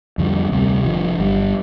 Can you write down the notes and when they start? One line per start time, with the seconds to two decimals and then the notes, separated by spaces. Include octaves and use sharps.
0.18 F2 D3 G3
0.52 D2 C3 G3 C4
0.85 F1 F2 D3 F3
1.19 G1 G2 G3